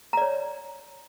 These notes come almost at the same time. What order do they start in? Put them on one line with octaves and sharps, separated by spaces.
A#5 D5 C#5